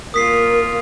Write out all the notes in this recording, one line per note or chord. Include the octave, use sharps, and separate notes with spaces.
A#3 F4 A#4 D#6 B6 C7